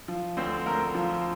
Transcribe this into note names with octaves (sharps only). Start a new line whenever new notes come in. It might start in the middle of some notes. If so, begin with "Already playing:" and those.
F3
D2 C4 C5
D2 A#4
F3